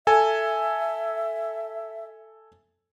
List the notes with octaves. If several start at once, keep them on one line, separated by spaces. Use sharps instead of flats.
A4 E5 G#5